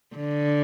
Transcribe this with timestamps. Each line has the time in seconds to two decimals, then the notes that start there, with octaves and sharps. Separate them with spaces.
0.15 D3